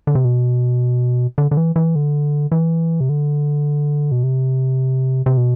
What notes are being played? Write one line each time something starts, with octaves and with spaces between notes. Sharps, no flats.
D3
C3
B2
D3
D3
E3
E3
D3
E3
C3
D3
B2
C3
C3
B2